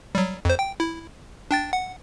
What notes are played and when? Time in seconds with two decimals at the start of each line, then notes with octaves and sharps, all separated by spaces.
0.15 F#3 G3
0.45 F2 C5
0.59 G5
0.80 E4
1.51 D4 G5 A6
1.73 F#5